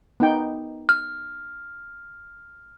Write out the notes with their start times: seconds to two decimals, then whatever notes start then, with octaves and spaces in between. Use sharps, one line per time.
0.20 B3 D#4 G5
0.89 F6